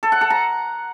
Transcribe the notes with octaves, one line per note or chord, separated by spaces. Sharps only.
A4
F#5
A4
A#5